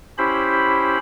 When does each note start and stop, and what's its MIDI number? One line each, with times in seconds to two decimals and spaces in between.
0.18 0.98 61
0.18 0.98 64
0.18 0.98 67
0.18 0.98 72
0.18 0.98 83